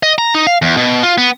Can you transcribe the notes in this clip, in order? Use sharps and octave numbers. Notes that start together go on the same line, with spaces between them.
D#5
A#5
D#4
F5
E2
B2
F4
B3